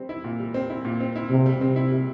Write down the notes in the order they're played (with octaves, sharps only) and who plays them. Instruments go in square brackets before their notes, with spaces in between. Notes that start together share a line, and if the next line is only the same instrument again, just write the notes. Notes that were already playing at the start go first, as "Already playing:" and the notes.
Already playing: [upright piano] G3 C4
E4
A#2
G3
C4
E4
A#2
C4
E4
[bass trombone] C3 [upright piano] G3
[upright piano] G3
[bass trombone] C3 [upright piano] C4
[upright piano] E4
G3